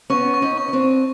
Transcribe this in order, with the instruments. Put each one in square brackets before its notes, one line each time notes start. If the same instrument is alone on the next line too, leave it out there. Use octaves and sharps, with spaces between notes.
[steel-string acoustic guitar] B3 C#4 [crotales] C#6
[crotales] C#6
[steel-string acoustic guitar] C#4 D#4
[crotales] C#6
[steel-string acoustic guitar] C#4
C4 D4
[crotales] C#6